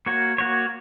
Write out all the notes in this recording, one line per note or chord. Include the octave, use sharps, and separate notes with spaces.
A#3 F#4 C#5
A#3 F#4 C#5